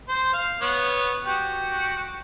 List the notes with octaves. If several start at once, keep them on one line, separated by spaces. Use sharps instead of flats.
C5
F5
B3 C#5
F#4 G4